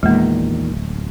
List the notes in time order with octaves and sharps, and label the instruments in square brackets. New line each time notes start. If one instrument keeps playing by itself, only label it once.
[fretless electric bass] E2 A#2 D#3 [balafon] G#3 A#3
[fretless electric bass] D1